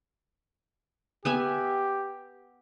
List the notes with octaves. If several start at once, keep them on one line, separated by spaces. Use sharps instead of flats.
B3 G4 E5 G#5